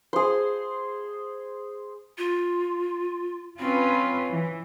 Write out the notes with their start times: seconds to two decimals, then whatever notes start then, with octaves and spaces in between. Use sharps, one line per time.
0.13 G#4 C5
2.18 F4
3.59 C4 C#4 F4 B4
4.33 E3